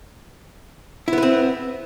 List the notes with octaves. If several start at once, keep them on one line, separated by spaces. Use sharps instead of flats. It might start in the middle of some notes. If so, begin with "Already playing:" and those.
B3 C4 E4 B4